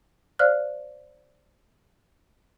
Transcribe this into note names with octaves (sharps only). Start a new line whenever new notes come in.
C5 D5 F5 F6 F#6